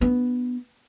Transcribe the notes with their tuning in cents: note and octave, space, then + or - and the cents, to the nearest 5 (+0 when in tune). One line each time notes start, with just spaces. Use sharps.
B3 +0 D4 +20